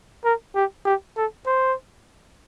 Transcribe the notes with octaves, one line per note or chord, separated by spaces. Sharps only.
A#4
G4
G4
A4
C5